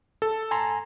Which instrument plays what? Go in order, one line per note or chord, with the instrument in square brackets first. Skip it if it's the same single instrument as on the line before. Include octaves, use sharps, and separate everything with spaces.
[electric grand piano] A4
[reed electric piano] G#5 A#5 C6